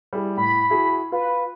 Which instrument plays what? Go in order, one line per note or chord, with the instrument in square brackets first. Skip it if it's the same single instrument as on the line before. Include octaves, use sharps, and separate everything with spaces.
[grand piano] G3 E4 G#4
[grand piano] A2 [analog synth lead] B5
[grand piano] E4 F#4 G#4
[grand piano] F4 [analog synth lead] B4